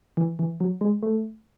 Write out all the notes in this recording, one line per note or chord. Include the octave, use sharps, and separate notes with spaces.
E3
E3
F#3
G#3
A3